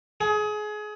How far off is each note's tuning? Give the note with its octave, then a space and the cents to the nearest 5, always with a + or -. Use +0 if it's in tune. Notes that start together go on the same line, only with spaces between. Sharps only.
G#4 +25